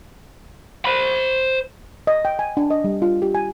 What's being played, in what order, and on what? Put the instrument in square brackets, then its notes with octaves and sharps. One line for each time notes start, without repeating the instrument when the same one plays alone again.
[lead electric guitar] C5 B5
[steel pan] D#5
G5
G#5
D4
D#5
G3
F4
G4
G#5